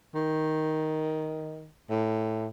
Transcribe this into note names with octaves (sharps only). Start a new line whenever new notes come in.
D#3
A2